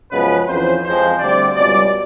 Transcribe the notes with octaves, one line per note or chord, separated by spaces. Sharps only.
F#2 C#3 F3 G#3 B3 B4
F2 C#3 E3 C5
F2 C3 F3 G#3 C5
D2 D3 G3 C4 D5
C#2 B2 G3 D5